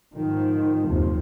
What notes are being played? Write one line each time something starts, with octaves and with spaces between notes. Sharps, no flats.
G#2 D#3 F3
F#1 D#2 C3 F3